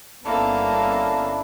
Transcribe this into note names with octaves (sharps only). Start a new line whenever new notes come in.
G1 A#3 B3 C#4 D4 E4 A4